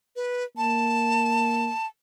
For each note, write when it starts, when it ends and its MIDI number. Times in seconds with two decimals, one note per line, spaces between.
0.16 0.44 71
0.57 1.71 58
0.57 1.86 81